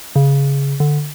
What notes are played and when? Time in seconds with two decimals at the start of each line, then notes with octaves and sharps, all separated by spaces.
0.16 C#3
0.80 D3